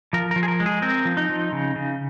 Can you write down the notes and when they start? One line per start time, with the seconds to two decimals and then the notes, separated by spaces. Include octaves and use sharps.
0.13 F3 A#4
0.31 F3 A#4
0.43 G#4
0.48 A#4
0.60 G#3
0.66 G#4
0.82 C4 A#4
1.05 F3
1.17 D#4
1.30 F3
1.52 C#3
1.75 C#3